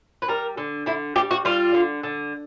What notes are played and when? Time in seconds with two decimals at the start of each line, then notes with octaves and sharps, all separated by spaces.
0.22 B4
0.28 G3 A#4
0.57 D3
0.86 D3 E4
1.16 G3 G4
1.31 F#4
1.45 G3 F4
1.74 D3
2.03 D3